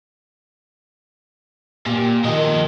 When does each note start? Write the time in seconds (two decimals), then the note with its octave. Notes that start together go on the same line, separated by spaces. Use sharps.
1.86 A#2 G4
2.24 D#3 F3 D#5